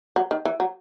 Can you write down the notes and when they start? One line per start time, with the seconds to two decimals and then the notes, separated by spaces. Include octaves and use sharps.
0.16 F#3
0.31 D#3
0.45 E3
0.60 F#3